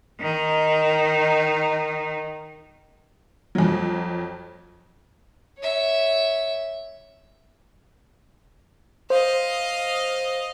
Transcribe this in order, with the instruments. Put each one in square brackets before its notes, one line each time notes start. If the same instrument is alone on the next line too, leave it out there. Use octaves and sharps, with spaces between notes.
[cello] D#3 D#4
[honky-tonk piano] F2 F#3
[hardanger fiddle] C#5 E5
[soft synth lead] C5 [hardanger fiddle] D#5 F5